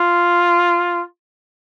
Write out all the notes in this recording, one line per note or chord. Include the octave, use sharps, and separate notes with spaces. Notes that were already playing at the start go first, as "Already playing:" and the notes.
Already playing: F4